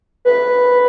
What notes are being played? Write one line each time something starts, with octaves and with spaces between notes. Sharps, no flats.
B4